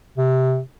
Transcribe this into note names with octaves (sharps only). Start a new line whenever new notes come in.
C3